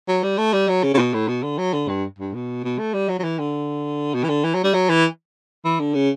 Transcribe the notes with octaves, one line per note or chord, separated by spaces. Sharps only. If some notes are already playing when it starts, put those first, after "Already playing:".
F#3
G3
A3
G3
F#3
C#3
C#3
B2
A2
B2
D3
F#3
D3
G2
G2
B2
B2
A3
G3
F#3
F#3
E3
D3
B2
E3
D3
E3
F#3
G3
F#3
E3
E3
D3
C#3